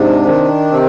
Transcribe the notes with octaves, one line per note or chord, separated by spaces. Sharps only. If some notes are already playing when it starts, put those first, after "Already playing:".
Already playing: G#2 C3 D4
D#3
C3 C4